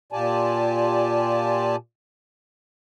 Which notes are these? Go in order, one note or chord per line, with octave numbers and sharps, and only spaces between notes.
A#2 F4 G4 D5 G#5 A5